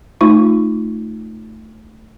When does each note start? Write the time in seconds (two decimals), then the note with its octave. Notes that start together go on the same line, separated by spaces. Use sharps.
0.21 A3 D#4 F4 C#6